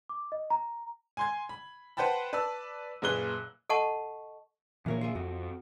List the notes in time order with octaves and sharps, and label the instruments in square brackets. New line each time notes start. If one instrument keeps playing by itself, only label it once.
[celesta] D6
D#5
A#5
[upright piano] G#5 C6 G#6
B5
B4 C5 F#5 G5 A5 B5
B4 D5 A5 E6
F#1 A#2 G#4 B4 F#6 G7
[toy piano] A4 D#5 F#5 A5 C#6
[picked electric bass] A#2 F3 A#3 [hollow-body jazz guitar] E3 A#4 C#5
[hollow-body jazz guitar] F4 G#4 E5
[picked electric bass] F2 [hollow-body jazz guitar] F#4